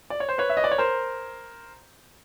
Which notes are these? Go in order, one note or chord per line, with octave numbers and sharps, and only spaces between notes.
D5
C#5
C5
B4 C#5
E5
D#5
D5
C#5
A#4 C5